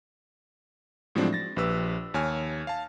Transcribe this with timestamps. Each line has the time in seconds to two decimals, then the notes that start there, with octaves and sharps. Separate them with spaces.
1.15 A2 F3 F#3 G#3 C4 D4
1.33 A6 A#6
1.56 A#1 G4 B4 E6
2.14 D#2 C#5 G#5 F6
2.67 F5 A5